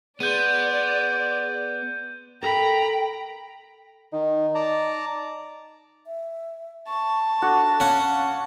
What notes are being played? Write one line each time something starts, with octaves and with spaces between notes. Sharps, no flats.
B3 G#4 D5 C6 G6 D#7
A4 A#4 G5 A#5 B5
D#3 D#4
D5 A5 A#5
E5
A5 C#6
D4 F#4 A4
C#4 F5 F#5